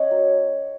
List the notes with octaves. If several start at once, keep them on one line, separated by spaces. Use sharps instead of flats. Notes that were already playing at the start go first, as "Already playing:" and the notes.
Already playing: C#4 D#5 F#5 G#5
F#3